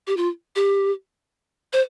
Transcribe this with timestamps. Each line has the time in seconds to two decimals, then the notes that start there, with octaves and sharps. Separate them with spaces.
0.07 G4
0.17 F4
0.56 G4
1.73 C5